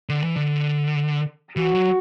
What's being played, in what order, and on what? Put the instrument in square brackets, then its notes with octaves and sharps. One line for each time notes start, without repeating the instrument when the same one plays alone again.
[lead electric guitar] D3
E3
D3
[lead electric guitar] E3 [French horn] F#4
[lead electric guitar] F#3